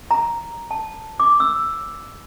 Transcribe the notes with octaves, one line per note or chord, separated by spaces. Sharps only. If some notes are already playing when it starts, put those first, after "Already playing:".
A#5
A5
D6
E6